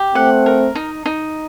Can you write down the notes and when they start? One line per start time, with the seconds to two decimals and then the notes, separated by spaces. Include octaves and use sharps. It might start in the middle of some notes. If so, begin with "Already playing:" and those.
Already playing: G4
0.15 A3 C4 F#5
0.46 A#4
0.75 D#4
1.06 D#4